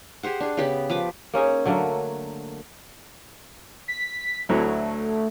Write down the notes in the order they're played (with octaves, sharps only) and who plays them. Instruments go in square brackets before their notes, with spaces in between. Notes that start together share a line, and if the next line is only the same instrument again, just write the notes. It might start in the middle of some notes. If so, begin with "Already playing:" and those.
[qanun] G4 G#4 C5 F#5
D4 G#4
C#3 B3 G4 B5
F3 B4 D6
[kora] A#3 C#4 D#4 G#4
D3 F#3 A3 A#3
[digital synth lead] B6
[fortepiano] D2 F#3 E4 [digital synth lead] A3